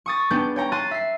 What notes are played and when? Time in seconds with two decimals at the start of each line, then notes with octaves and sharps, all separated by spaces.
0.06 C#6 D#6 A6
0.31 B3 D4 G#4 G5 G6
0.56 C#5 G5 A#5
0.72 A#5 C6 F#6 A6 D#7
0.91 E5 C7